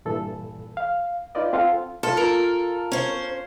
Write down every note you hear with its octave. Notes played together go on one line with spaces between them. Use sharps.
G2 A#2 E3 A4
F5
D#4 F4 B4 D5 D#5
C4 F4 A4 F5 F#5
F4 A4
A#4
C#4 C5